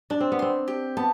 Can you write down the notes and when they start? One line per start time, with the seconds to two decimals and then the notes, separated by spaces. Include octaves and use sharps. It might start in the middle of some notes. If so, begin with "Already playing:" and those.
0.10 D4 D5
0.21 C4
0.32 B3
0.39 C4 C6
0.68 G4
0.97 B3 A5